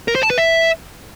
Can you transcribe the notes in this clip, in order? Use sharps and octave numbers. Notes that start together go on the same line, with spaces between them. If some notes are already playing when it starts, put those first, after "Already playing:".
A#4
C5
A5
B4
E5